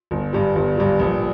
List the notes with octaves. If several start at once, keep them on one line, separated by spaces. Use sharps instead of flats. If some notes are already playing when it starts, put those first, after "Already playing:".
G1
G2 G3
G1
G2 G3
A#1